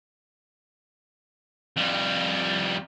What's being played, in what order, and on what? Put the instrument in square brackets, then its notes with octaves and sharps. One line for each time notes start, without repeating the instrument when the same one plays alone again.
[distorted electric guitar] F2 G3